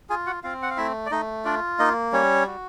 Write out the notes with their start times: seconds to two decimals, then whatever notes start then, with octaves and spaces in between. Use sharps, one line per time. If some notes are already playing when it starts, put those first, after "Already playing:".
0.10 F4 G#4 G#5
0.26 F#4 F#5
0.44 C4 F4 F5
0.62 F#5
0.71 F5
0.77 A3 E4 E5
1.06 D5
1.11 A3 D#4 D#5
1.45 D4 F4 D5
1.79 A#3 D#4 D#5
2.13 G3 C#4 C#5
2.47 F#4